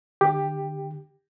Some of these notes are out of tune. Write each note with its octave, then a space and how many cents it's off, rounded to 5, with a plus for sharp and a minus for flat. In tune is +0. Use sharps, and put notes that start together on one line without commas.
D3 +30 G4 +10